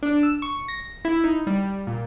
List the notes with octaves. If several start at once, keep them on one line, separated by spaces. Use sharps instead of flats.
D4
E6
C#6
A#6
E4
D#4
G3
A#2